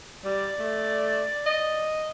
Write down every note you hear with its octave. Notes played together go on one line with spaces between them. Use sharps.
G3 D5
A3
D#5